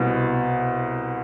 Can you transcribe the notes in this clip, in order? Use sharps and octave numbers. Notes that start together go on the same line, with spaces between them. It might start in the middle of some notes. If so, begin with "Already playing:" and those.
Already playing: C2 B2